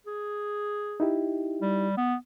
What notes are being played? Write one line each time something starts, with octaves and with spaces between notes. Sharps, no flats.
G#4
D#4 E4 G4
G3
B3